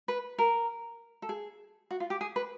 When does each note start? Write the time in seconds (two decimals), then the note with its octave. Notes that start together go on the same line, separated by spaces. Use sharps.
0.08 B4
0.38 A#4
1.22 A4
1.29 G#4
1.91 F#4
2.00 F4
2.10 G4
2.21 G#4
2.36 B4